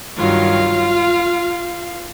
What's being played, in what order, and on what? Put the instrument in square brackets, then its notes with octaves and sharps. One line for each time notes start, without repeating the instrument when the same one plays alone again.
[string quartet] G2 D#3 F#3 F4 F5